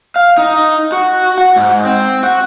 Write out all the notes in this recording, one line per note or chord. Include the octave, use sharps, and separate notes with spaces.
F5
D#4
F#4
F#5
G#2
C4
F#4